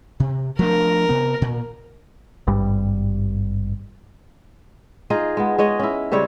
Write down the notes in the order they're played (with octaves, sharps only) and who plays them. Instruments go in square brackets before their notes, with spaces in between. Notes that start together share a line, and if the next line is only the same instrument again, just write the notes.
[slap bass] C3
[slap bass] F3 A3 D4 [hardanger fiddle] A#4
[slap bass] C3 B3
A#2
[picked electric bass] G#1 G2 G3
[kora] D#4 F4 G#4 D#5
G#3 B3
G#3 C#5 D#5
C#4 E4
C#3 G3 C4 C#5